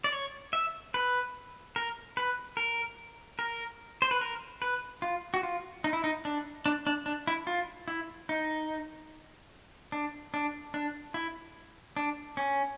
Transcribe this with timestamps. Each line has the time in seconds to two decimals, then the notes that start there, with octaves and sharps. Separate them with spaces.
0.04 D5
0.12 C#5
0.53 E5
0.94 B4
1.76 A#4
2.17 B4
2.57 A#4
3.39 A#4
4.02 C5
4.11 B4
4.21 A#4
4.62 B4
5.02 F4
5.34 F#4
5.43 F4
5.84 D#4
5.93 E4
6.04 D#4
6.25 D4
6.66 D4
6.87 D4
7.06 D4
7.27 E4
7.47 F4
7.88 E4
8.29 D#4
9.92 D4
10.34 D4
10.74 D4
11.14 E4
11.97 D4
12.37 C#4